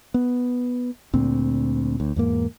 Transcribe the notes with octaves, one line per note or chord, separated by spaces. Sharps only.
B3
D2 A#2 C4
D2
E2 G#2 A#3